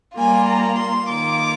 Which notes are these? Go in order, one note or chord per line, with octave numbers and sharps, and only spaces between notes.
G3 A#3 F4 G#5
A#5
C6
D#3 A#3 F4 D6